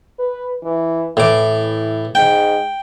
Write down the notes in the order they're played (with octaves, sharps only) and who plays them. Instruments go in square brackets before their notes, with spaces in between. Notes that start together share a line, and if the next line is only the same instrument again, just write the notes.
[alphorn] B4
E3
[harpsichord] A2 D6 [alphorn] E3
[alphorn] G#2 [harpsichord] G5